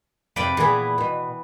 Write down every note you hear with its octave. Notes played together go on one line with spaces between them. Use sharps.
F2 C3 B4 D5 G5
A#2 E3 B3 G#4 B4
B2 B4